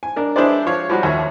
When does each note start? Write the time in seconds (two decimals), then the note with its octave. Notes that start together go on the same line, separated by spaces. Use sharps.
0.03 G#5
0.16 D4 A#4
0.36 D4 E4 G#4 B4 C5 D5
0.66 F3 C#5 F5
0.89 F3 G3 F#4
1.03 D#2 C#5 E5